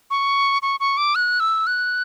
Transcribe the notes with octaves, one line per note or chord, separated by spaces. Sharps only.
C#6
C#6
C#6
D6
F#6
E6
F#6